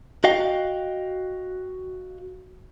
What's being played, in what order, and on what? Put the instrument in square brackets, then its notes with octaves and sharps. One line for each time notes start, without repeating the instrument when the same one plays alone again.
[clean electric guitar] F#4 D#5 F5 G5